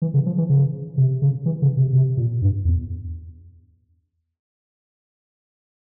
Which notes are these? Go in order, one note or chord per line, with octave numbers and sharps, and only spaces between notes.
E3
C#3
F3
E3
C#3
C3
C#3
E3
C#3
C3
C3
A#2
G2
E2